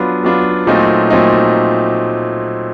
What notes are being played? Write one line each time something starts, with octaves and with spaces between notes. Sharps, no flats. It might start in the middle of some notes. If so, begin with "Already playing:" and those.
Already playing: F#3 B3 D4 F4
F#3 B3 D4 F4
A#2 F#3 A3 C4 D#4
A#2 F#3 A3 C4 D#4